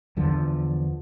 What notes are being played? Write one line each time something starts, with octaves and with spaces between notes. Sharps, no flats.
E2 D3 F3